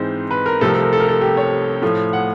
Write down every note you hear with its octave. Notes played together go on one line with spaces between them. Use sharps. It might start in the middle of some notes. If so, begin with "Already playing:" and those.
Already playing: G#2 E3 G#3 C4 C5
B4
A#4
C2 C3 F3 A3 C4 A4
A#4
A4
A#4
A4
A#4
A4
G4
C#5
A2 F3 A3
F#5